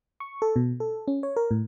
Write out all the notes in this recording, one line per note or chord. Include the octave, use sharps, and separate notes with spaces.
C#6
A4
B2
A4
C#4
C#5
A#4
A2